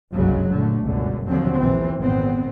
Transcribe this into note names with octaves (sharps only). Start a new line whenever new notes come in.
F#1 C2 G2 C#3 F#3 G#3
A#1 A#2 D3 A3
G1 C#2 F#2 B2 D3
D#2 D3 F3 F#3 C4
A#1 E3 C4
G#1 F2 A#2 B3 C4